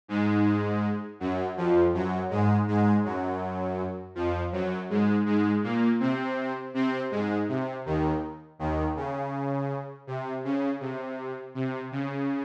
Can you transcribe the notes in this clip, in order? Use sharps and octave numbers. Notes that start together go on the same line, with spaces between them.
G#2 G#3
F#2 F#3
F2 F3
F#2 F#3
G#2 G#3
G#2 G#3
F#2 F#3
F2 F3
F#2 F#3
G#2 G#3
G#2 G#3
A#2 A#3
C3 C4
C3 C4
G#2 G#3
C3
D#2 D#3
D#2 D#3
C#3
C3
C#3
C3
C3
C#3